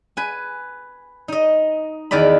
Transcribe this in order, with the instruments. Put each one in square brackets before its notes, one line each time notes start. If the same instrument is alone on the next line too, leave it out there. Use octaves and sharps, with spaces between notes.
[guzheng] B4 G#5
D#4 D#5
E2 D#3 D5 D#5 B5